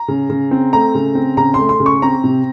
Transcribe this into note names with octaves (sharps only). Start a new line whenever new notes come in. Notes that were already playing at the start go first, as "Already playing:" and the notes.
Already playing: A#5
C#3
C#3
C4
A3 A#5
C#3
C4
C#3 A#5
A3 C6
C6
C#3
C#6
C4 A#5
C3